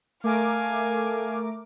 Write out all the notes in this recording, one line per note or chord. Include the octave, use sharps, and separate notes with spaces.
A3 A#4 F5 G#5 D6